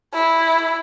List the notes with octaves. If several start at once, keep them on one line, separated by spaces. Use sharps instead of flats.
E4